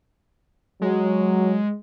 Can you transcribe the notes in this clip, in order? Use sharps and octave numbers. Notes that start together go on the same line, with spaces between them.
F#3 G#3